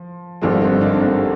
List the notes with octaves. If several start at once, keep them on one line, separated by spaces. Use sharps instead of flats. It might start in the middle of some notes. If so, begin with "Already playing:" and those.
Already playing: F3
G#1 G2 D3 F3 G#3 C4
C4 D#4
A#3 D4
C4
A#3 D4
G3